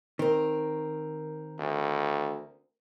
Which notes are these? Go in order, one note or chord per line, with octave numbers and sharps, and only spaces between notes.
D#3 C4 A#4
D2